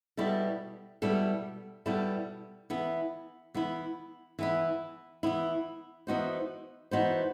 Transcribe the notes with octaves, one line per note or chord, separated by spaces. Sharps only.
B2 G3 B3 E4 A4
B2 G3 B3 E4 A4
B2 G3 B3 E4 A4
E3 B3 E4
E3 B3 E4
E3 B3 E4
E3 B3 E4
E3 B3 D#4 F#4 C5
E3 B3 D#4 F#4 C5